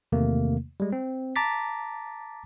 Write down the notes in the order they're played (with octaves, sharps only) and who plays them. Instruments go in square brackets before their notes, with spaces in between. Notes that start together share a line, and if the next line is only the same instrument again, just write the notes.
[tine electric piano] E2 C3 D#3 A3 A#3
G3 G#3
C4
A5 A#5 D6 A6 B6